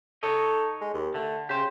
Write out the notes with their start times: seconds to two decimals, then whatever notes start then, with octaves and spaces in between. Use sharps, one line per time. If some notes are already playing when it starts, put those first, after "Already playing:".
0.23 D#4 A4 C#5 D#5
0.81 G#3
0.94 D#2
1.14 D3 A3
1.49 C#3 G4 C5